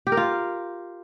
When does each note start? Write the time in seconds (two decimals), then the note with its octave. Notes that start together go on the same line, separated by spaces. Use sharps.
0.07 G4
0.12 A#4
0.17 F4